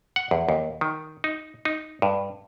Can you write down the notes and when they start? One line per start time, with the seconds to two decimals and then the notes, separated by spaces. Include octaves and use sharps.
0.16 F#5
0.31 E2
0.49 D#2
0.81 D#3
1.24 D#4
1.65 D#4
2.02 G2